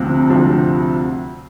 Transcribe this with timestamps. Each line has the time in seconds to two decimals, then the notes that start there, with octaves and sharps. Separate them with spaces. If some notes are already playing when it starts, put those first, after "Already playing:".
Already playing: D2 C3 F3 C4
0.30 D2 C3 F3 C4